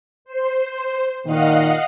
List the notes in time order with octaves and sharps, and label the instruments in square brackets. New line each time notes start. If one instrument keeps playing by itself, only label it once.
[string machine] C5
[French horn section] A#2 D#3 [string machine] D#5 F5 F#5